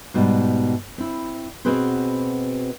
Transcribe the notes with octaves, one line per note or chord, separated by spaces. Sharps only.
G#2 B2 G3
C4 E4
B2 C4 F#4 G#4 B4 C5